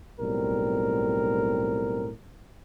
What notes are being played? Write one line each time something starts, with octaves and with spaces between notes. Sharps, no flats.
B1 A2 G3 C4 A#4